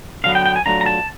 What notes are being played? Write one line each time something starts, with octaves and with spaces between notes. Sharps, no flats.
D3 F#3 B3 F5
G5
G5
G#5
F#3 A3 D4 F4 A#5
A#5
A5